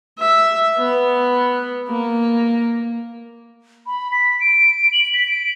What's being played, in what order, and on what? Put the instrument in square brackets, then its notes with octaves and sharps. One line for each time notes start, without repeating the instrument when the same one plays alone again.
[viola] E5
B3
A#3
[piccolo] B5
B6
D7
F#7
B6
D7